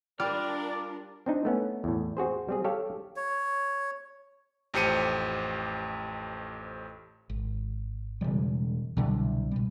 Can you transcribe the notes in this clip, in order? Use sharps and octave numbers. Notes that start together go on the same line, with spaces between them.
G3 D4 F4 A#4 D5 F6
C4 D4 D#4
A3 B3 C#4
E2 A2
C4 F#4 G#4 C5
G3 C4 G#4
G4 A4 C#5 F5 G5
C#5
A1 F2 G4 C5 C#7 D#7
G#1
E1 C#3 G3
C2 B2 D3 F#3
B2 G3